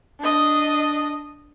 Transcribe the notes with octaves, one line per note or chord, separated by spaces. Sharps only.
D4 D#5